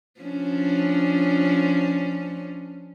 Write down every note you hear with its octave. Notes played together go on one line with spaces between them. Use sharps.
F3 C#4 D4